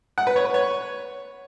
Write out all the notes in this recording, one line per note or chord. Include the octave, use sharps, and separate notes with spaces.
F#5
B4
C#5
B4
C#5